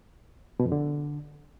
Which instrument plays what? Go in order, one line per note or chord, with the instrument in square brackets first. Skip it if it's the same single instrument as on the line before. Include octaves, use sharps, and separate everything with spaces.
[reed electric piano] B2
F2
D3